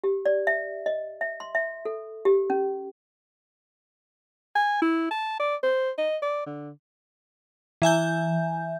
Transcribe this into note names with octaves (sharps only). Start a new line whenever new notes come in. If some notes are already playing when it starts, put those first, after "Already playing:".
G4
D5
E5
D#5
E5
C6
E5
A4
G4
C#4
G#5
E4
A5
D5
C5
D#5
D5
D3
E3 E5 G#5 G6